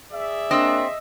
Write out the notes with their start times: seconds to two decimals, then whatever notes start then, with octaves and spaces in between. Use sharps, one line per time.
0.11 G#4 D5 E5
0.51 A#3 C4 D4 D#5 E6